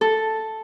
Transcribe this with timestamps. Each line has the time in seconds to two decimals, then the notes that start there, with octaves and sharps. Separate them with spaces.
0.01 A4